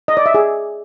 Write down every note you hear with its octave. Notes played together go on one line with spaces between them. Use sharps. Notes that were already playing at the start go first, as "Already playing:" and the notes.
D#5
D5
E5
G#4